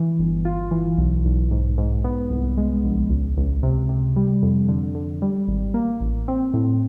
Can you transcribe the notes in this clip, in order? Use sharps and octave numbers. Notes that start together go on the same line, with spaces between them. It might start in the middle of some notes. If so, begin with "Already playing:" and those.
Already playing: E3
G1
F4
E3
B1
B1
G#2
G#2
B3
C2
G#3
A#1
C#2
C#2
C3
C3
G3
F2
D3
D3
G3
G#1
A#3
A1
C4
A2